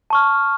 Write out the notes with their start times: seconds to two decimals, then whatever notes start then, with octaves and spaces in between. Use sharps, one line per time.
0.10 A5 C#6 F6